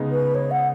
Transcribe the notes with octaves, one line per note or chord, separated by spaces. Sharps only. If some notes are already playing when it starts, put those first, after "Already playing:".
Already playing: C#3 G#3 B3 D#4
B4
C#5
F#5